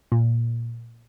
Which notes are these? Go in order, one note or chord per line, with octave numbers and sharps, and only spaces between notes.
A#2